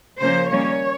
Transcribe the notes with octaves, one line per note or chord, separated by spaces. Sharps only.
C#3 F3 A#3 C#4 C5
D#3 G3 A#3 C#4 C#5